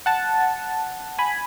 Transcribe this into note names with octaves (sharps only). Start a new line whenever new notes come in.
F#5 A5
G#5 B5